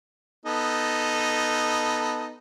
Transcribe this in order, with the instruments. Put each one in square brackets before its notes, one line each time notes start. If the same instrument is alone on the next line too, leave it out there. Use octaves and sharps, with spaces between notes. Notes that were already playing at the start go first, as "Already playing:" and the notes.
[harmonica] B3 D#4 A4